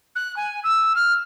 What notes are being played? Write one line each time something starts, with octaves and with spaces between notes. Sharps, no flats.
F#6
G#5
E6
F6